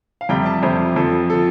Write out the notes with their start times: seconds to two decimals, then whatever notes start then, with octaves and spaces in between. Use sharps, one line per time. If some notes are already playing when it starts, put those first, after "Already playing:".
0.21 F5
0.29 F2 C3 G3 G5
0.46 A5
0.63 F2 C3 G3 C5
0.96 F2 F3 A4
1.30 F3 A4